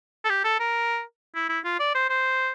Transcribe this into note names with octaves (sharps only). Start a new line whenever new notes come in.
A4
G4
A4
A#4
E4
E4
F4
D5
C5
C5